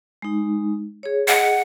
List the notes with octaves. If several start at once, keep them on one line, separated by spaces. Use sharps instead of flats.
G#3 D#4
G#4 C#5
G#4 D#5 F#5